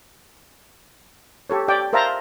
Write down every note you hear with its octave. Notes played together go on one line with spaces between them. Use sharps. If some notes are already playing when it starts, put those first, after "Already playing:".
G4 A4 C#5
G4 D5 G5
A#4 C5 E5 F5 A5 A#5